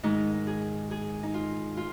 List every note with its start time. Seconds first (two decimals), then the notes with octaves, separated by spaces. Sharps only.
0.03 G#2 D#3 D#4
0.47 G#4
0.91 G#4
1.23 D#4
1.34 F4
1.77 F4